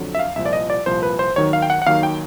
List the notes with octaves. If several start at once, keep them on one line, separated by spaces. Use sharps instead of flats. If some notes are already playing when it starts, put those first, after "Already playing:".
Already playing: F2 D3 F#3
E5
F5
C2 A#2 F3 E5
D5
D#5
D5
C2 A#2 F3 C5
B4
C5
D#2 D#3 F#3 C#5
F5
G5
F#5
F#5
D#2 D#3 F#3 F5
G5